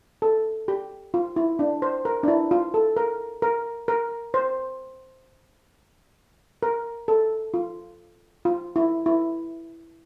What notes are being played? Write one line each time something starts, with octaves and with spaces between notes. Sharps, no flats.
A4
G4
F4
E4
D4
C5
A#4
D4
E4
F4
A4
A#4
A#4
A#4
C5
A#4
A4
F4
F4
E4
E4